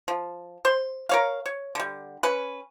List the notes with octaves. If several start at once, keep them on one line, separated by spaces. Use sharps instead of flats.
F3
C5 C6
A#4 C#5 F5
C#5
D3 G3
C#4 B4